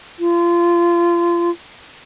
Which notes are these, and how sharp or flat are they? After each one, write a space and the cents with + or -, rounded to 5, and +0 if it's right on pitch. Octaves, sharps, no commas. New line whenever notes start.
F4 -25